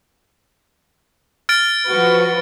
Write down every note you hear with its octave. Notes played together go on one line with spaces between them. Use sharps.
F6 A6 D7
F3 F#4 B4